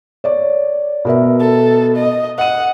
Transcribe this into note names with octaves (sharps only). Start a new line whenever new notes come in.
C#5 D5
B2 A#4 E5
A4
D#5
D#5 F#5 D#7